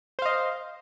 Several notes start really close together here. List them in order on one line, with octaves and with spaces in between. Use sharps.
C5 F5 D#5